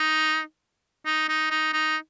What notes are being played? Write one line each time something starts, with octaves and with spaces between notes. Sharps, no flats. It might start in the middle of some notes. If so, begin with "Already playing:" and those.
Already playing: D#4
D#4
D#4
D#4
D#4